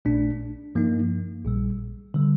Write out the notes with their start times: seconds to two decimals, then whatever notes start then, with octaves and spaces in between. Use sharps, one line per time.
0.05 A#1 A#2 A3 D4
0.75 G2 F3 A#3 D#4
1.45 A#1 A#2 G3
2.14 D3 G3